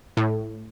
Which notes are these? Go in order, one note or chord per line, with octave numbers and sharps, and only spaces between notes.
A2